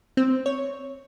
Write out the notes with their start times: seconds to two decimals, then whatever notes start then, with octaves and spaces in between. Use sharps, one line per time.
0.17 C4
0.46 C#5